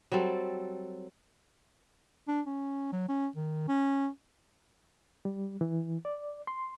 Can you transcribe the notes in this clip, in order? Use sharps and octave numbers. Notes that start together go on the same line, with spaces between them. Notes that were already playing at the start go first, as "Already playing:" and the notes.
F#3 G3 C4 A4
D4
C#4
F#3
C#4
D#3
C#4
G3
E3
D5
C6